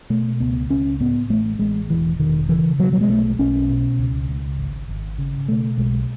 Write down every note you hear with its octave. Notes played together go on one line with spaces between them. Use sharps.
B2 A3
C#2 B3
C#2 C#4
A2 B3
A1 A3
A1 G#3
E1 E3
E1 D#3
C#3 E3
B2 F#3
F#3
G#3
B1 A3
B1 C#4
B2
C#2
C#2
G#1
G#1
C#3
B2 A3
B1 G#3